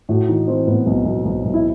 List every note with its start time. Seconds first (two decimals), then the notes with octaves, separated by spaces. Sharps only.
0.09 A2 F#4
0.28 E3 D#4
0.47 E3 C4
0.67 A2 B3
0.86 B1 B3
1.05 B1
1.25 B1
1.45 B1
1.54 E4